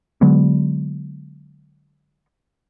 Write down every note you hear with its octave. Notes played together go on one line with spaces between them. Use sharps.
D3 F#3 G#3 B3